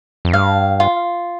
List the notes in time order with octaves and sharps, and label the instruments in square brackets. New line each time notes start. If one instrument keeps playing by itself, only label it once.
[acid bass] F2
[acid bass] G2 [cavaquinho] F5
[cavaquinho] F4